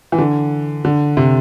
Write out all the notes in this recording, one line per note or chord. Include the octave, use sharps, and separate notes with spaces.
E3
D3
D3
C3